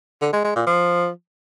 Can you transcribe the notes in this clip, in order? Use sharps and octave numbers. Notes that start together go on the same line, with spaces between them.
D3
G#3
G#3
A#2
F3